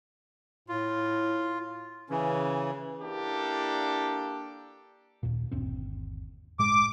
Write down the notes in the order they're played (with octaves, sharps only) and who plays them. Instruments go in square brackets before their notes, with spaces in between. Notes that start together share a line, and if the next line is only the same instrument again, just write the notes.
[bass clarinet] A2 [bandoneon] F4
[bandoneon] C#3 E3 [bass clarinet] C#4
[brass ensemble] A#3 D4 E4 G4 A4
[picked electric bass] D#2 A#2
G1 D#2 C4
[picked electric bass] G1 A2 G#3 [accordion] D6